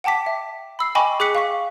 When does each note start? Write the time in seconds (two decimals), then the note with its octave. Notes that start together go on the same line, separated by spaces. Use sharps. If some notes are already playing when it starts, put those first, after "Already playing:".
0.04 F#5 G5 A5 D6 B6
0.26 E5
0.79 B5 E6 C7
0.95 D#5 G5 G#5 B5 C#6 D6
1.20 G#4 D6 F#6 B6 C#7
1.35 F5 C#6 B6